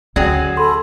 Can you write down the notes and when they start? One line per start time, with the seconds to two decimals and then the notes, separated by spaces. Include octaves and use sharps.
0.16 D2 F#3 C#4 G#4 D5 G5
0.57 A4 B5 C6